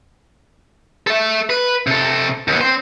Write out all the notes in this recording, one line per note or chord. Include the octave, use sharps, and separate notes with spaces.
A4 E5
B4
C3 A4
D#2 B3
C4 C5